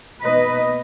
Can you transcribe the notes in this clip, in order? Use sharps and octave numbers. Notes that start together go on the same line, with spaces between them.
B2 A#3 D#4 B4 D#5